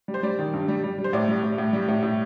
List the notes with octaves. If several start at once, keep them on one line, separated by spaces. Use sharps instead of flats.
G3
C5
G3 D5
D#3
G2
G3
G3
G3
C5
A2 D5
G3
A2
A2
G3
A2
A2